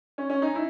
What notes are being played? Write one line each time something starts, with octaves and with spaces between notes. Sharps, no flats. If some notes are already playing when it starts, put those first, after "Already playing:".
C#4
C#4
D#4
E4